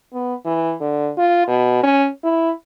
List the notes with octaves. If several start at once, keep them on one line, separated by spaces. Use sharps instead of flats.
B3
E3
D3
F4
B2
C#4
E4